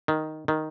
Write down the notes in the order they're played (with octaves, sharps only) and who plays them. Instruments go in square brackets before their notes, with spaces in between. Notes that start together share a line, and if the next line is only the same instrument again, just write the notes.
[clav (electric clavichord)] D#3
D#3